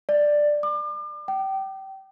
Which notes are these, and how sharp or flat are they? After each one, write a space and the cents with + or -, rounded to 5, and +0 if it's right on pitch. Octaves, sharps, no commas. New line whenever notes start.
D5 +10
D6 +35
G5 -25